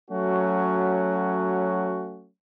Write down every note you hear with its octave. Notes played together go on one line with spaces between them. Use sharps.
F#3 A3 C#4 F#4